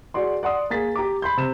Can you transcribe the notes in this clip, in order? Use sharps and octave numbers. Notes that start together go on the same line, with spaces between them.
F#4 G#4 D5 C6
D5 F#5 C6 D#6
A#3 G#4 A6 B6
G4 A#5 D6
B5 C6 G6
C3 E7